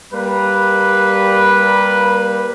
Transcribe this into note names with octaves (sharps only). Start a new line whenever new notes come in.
G3 A#3 B4